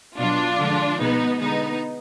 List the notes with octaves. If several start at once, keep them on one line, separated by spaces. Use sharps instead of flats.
B2 F#3 D4 F4
D3 F3 G#3
B2 G#3 B3 D#4
D3 G#3 B3 D#4